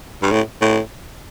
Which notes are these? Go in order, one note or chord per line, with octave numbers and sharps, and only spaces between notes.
G2
A2
A2